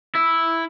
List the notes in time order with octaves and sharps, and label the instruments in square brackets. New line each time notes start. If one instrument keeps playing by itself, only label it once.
[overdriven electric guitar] E4